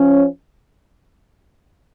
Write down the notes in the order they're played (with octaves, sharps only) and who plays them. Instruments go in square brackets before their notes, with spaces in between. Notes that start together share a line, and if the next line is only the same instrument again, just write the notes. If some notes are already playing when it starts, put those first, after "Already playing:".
Already playing: [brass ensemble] F3 C#4